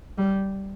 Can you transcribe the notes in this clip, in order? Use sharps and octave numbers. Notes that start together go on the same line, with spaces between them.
G3